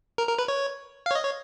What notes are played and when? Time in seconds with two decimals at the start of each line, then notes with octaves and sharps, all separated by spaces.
0.18 A#4
0.29 A#4
0.39 B4
0.48 C#5
1.06 F5
1.11 C#5
1.15 D#5
1.25 C#5